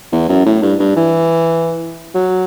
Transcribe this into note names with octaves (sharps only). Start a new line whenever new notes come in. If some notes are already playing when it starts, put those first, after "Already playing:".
E2
F#2
A2
G2
G2
E3
F#3